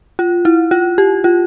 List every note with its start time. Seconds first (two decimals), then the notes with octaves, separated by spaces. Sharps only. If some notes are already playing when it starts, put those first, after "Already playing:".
0.19 F4
0.45 E4
0.71 F4
0.98 G4
1.24 F4